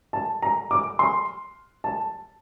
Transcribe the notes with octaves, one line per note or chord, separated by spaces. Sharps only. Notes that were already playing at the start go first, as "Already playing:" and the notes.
A5
A#5
D6
C6
A5